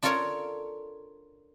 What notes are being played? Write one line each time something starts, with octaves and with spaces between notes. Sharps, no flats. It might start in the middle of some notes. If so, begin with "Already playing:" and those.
D4 F4 A4 A#4 C#5